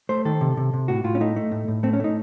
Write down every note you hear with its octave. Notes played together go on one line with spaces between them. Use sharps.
A3 C5
D#3 A4
C3
C3
C3
A2 F#4
A2 F4
C#4
A3 D#4
A3
A2
A2
A3 C4
C#4
A3 D#4